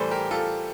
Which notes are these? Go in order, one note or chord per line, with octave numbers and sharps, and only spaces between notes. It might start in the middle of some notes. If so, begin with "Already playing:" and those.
Already playing: A2 E3 G3 A4 C5
G4 A#4
F4 A4